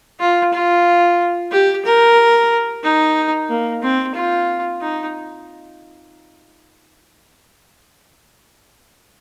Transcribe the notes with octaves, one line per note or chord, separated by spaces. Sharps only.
F4
F4
G4
A#4
D#4
A#3
C4
F4
D#4